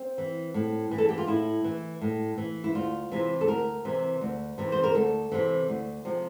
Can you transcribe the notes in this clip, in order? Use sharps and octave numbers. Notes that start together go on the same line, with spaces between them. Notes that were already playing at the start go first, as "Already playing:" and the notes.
Already playing: C4
E3
A2
E3
A4
G4
F4
A2 E4
E3
A2
E3
E4
D2 F4
C3 E3
A4
D2 A#4
C3 E3
D2
C3 E3
C5
A#4
D2 A4
C3 E3
D2
C3 F3